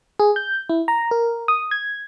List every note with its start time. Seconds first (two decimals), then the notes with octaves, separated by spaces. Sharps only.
0.19 G#4
0.36 G6
0.69 E4
0.88 A#5
1.11 A#4
1.48 D#6
1.71 G#6